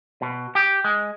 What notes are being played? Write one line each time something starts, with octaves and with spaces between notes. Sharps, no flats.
B2
G4
G#3